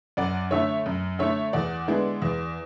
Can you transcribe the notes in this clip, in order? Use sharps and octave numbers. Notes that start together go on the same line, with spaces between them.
F#2 D5 F#5
D3 A3 C#5 E5
F#2
D3 A3 C#5 E5
E2 D5 F#5
D3 G#3 B3 E4
E2